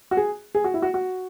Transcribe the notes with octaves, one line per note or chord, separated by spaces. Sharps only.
F#4
G#4
G#4
F#4
E4
F#4
F#4